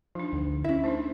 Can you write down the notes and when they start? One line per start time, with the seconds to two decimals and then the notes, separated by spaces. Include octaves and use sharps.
0.15 F3 D4 D#4
0.33 D2
0.64 C#4 E4 E5
0.84 A3 D4 D#4 C5